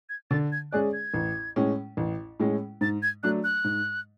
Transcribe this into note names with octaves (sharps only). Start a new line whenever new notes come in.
G#6
D3 A6
G#6
G#3 C#4 G#4 D5 F#6
G#6
A1
A2 G#3 C#4
A1
A2 G#3 C#4
G#2 A6
G#6
F#3 A3 D4 F#6
F#6
G#2